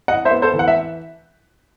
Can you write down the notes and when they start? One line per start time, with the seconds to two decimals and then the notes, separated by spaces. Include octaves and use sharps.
0.08 E4 D#5 F#5
0.25 C5 E5
0.31 B3
0.42 A4 C5
0.53 E3
0.59 F#5
0.68 E5